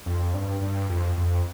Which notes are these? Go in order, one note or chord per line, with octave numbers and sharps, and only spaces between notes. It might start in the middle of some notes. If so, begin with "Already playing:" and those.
F2
G2
G2
F2
F2